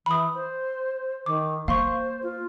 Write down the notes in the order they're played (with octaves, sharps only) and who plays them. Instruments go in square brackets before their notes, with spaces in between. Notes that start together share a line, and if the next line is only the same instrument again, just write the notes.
[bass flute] E3 [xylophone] B5 D#6
[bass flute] C5
[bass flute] D#3 [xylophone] D6
[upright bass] A#3 [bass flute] C5 [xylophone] F5 C6 C#6
[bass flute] F4